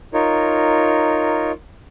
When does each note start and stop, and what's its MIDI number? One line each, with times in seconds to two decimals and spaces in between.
0.13 1.52 63
0.13 1.52 65
0.13 1.52 70
0.13 1.52 73